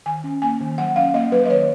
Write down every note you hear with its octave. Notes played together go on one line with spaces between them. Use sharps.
D#3 G#5
C#4
A#3 G#5
D#3
F#3 F#5
C#4 F5
A#3 D#5
F#3 B4
D#5
D#3 C#5